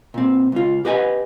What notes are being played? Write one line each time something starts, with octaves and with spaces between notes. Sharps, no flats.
A#2 C4
C#2 F4
G4 B4 D#5 G5 G#5